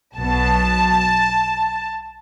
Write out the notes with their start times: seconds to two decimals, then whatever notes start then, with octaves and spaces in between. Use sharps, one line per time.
0.17 B1 B2 F#3 B3 A5